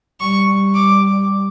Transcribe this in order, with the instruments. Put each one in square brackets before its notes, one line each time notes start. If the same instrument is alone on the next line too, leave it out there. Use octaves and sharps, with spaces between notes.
[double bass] G3 [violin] C#6
[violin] D6